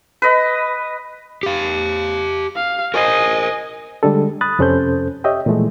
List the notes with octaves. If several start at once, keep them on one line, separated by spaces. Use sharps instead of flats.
B4 D#5
G4 F5
F5
A#4 C5 D#5 G#5
D3 G3 G#3 D4 A4
B5 D#6 F#6 A6
F2 C3 C#4 A4 C5 G6
G4 C#5 D#5 E5 G5
A#2 E3 F3 G#3 A3